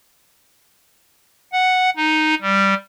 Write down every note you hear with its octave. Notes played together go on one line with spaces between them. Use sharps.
F#5
D#4
G3